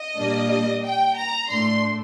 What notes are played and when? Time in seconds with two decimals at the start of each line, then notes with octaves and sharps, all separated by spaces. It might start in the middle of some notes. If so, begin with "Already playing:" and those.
Already playing: D#5
0.17 A#2 G3 A#3 D4
0.84 G5
1.16 A#5
1.50 A2 A3 D4 C6